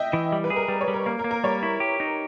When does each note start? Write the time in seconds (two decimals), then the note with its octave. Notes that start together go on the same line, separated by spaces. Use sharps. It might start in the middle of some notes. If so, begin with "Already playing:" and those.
Already playing: D#5 E5 G5
0.13 E3
0.32 G3
0.44 B4
0.50 G#4
0.56 A#4
0.68 G3
0.81 C#5
0.88 G3
0.94 A#4
1.06 A#3 A#4
1.19 A#4
1.24 A#3
1.31 A#4
1.44 G3 C#5
1.63 E4
1.80 G4
2.00 D#4